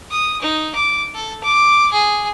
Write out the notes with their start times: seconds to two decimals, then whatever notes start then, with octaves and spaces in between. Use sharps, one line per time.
0.11 D#6
0.41 D#4
0.75 D6
1.15 A4
1.43 D6
1.92 G#4